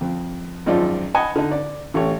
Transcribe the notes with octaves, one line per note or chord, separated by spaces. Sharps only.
F2
G#1 F#2 F3 D#4 F4 D5
D#5 F#5 G#5 A5 B5
D3 D#4
D5
A1 A3 G4 C#5